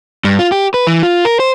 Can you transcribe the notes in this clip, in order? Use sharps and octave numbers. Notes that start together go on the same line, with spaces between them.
G2
F4
G4
B4
E3
F4
A#4
C5